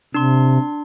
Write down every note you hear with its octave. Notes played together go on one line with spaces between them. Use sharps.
C3 D4 C6